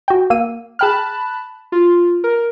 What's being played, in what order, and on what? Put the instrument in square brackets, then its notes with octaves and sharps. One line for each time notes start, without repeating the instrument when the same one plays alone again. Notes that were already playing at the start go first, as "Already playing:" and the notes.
[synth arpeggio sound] F#4 G5
A#3 E6 D#7
[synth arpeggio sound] G#4 G5 F6 [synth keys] A5 B5 F#6
[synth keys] F4
A#4